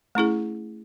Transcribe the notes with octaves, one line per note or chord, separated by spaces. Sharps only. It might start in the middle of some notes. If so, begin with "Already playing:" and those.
A3 C#4 E4 G#4